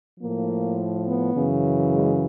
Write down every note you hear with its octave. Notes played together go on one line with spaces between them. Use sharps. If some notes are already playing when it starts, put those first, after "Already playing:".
A2 F3 A#3
B3
F#2 C#3 E3
G#3